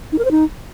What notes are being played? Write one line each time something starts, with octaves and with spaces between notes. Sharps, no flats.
D#4
A#4
C5
D#4